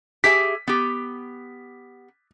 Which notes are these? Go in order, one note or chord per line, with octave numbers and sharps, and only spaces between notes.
G4 G#4 E5 B6
B3 G4